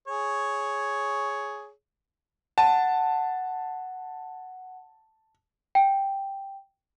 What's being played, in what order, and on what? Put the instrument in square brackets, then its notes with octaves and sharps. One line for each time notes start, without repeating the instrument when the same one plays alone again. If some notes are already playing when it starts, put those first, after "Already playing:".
[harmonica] G#4 C#5
[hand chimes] F#5 [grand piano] A5
[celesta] G5